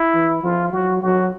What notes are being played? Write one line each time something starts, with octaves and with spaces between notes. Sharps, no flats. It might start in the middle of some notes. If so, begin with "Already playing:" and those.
Already playing: E4
E3
F3 F4
F#3 F#4
F#3 F#4